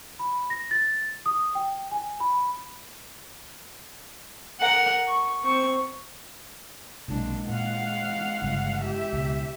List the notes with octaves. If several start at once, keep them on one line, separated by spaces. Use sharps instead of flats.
B5
A#6
A6
D#6
G5
G#5
B5
A#4 F#5
C#6
C4 C#6
B1 C3 G#3 A#3 D4
A#2 F5 F#5
G1 G2 C#3
G4 E5
C#2 B2